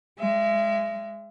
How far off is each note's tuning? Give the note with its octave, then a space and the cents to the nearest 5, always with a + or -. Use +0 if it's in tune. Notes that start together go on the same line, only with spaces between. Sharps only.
G#3 +0 E5 +40